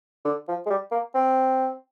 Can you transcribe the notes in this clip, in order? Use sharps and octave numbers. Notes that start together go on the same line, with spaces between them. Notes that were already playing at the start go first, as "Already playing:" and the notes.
D3
F3
G#3
G3
A#3
C4